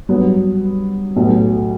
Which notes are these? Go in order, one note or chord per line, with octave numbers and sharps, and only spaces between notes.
G2 F#3 B3
B1 A2 F#3 B3